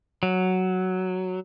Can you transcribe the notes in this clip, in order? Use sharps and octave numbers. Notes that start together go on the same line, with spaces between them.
F#3